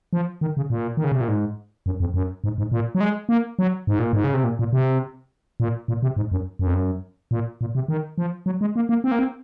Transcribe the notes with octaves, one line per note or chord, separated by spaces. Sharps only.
F3
D#3
C#3
A#2
D#3
C#3
C3
A#2
G#2
F#2
F2
F#2
G#2
G#2
A#2
F#3
G#3
A#3
F#3
G#2
A#2
G#2
C#3
C3
A#2
A#2
C3
A#2
A#2
C3
G#2
F#2
F#2
F2
F#2
A#2
A#2
C3
D#3
F3
F#3
G#3
A#3
A#3
C4
A#3
C4